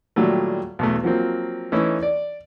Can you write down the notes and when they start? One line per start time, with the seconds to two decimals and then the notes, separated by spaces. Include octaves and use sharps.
0.16 A#2 D#3 F#3 G3 A3
0.79 B1 E2 A3
1.03 F3 F#3 A#3 C4
1.72 E3 A3 C#4 D#4 E4
2.02 D5